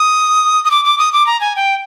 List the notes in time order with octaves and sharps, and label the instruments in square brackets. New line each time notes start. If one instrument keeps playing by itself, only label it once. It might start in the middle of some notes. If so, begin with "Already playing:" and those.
Already playing: [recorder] D#6
D#6
D6
D6
D#6
D6
A#5
G#5
G5